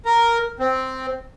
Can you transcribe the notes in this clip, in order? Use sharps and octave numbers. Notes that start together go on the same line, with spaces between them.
A#4
C4